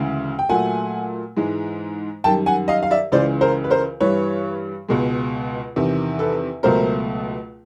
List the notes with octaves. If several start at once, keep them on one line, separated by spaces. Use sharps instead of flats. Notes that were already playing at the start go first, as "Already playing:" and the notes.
Already playing: D2 C#3 E3 G#3
G5
A#2 F#3 A3 F#5 G#5
G#2 E3 G#3
F#2 D#3 G3 G5 A5
F#5 G#5
D#5 F5
F5
D5 E5
C#2 C#3 E3 C5 D5
A#4 C5
B4
A#4 C5
G2 E3 G3 B4 C#5
C#2 B2 G#3
E2 C3 D#3
A4 B4
C#2 B2 F#3 A3 A#4 C5